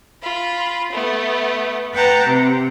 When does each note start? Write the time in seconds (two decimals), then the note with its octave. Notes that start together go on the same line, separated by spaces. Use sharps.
0.22 F4 B5
0.92 A3 B3
1.92 B4 F#5 G5 A5 A#5
2.25 C3